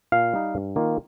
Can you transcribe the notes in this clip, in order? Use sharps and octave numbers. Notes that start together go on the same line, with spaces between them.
A#2 F5
G3 D#4
G2
D#3 A#3 F4